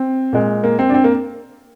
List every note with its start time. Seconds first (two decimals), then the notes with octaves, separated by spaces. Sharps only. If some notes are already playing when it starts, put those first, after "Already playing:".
Already playing: C4
0.33 A#2 G#3
0.64 A#3
0.79 C4
0.89 D4
0.94 C4
1.04 A#3